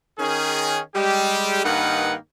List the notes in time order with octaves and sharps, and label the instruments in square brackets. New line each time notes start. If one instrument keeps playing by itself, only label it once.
[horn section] D#3 C#4 G#4
G3 G#3 G4
G2 D#3 A#3 D#4 B4 F#5